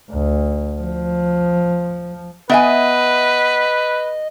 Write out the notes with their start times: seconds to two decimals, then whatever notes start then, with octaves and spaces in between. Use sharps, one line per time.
0.11 D2
0.82 F3
2.50 B3 B4 D#5 E5 G#5